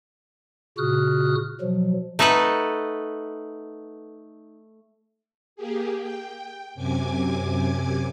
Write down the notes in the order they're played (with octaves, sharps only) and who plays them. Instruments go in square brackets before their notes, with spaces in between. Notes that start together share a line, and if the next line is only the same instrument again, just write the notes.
[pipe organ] A#2 C#3 F#4 D#6 F6 F#6
B2 F3 F#3
[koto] A3 D#4 A4 B4 F#5
[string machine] A#3 G4 G#4
G5
F#2 C3 G#5 D6 G#6